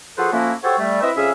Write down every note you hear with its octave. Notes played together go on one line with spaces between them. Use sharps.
F3 F#4 G#4 A4 B4 C5
F3 A3 A#3 C#4 E4 F#4
F#4 G4 A4 C5 C#5
G3 A3
C4 E4 B4 D#5 E5
F2 C#3 C#4 G#4 E5